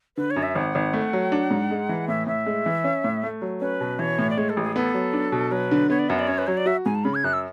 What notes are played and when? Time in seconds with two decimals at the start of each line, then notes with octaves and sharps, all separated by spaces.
0.17 D3 B4
0.30 C#5
0.36 F#2
0.43 E5
0.55 G#1 F#5
0.75 G#1
0.93 A3
1.13 F#3
1.32 D4
1.51 G#2
1.71 G#3
1.89 E3
2.08 A2 E5
2.27 A2 E5
2.46 G#3
2.66 E3
2.84 C#4
3.04 A2
3.23 A3
3.42 F#3
3.61 C#4 B4
3.81 B2
3.99 E3 C#5
4.19 A2
4.30 D5
4.37 G#3 C#5
4.49 A4
4.57 A1
4.62 G#4
4.75 B3 A4
4.94 F#3
5.13 D4
5.32 B2
5.51 F#3 B4
5.71 D3
5.90 B3 C#5
5.99 D5
6.09 F#2 F#5
6.19 D5
6.27 C#4 C#5
6.38 B4
6.47 F#3 C#5
6.57 D5
6.66 F#4 E5
6.85 G#2 G#5
6.95 A5
7.04 C#3 B5
7.14 G#6
7.24 F#2 F#6
7.33 E6